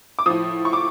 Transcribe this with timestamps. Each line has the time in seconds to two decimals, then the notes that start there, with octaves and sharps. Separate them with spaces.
0.19 D6
0.26 A2 F3 D#6
0.65 C#6
0.73 D6